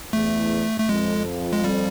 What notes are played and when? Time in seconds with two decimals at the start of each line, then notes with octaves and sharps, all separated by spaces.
0.13 E2 A3
0.80 A3
0.89 F2 G#3
1.53 G#3
1.64 G3